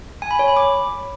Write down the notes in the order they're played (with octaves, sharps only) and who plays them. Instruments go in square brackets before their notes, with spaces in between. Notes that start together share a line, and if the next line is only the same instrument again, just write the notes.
[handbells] G#5
B5
C#5
B5
D6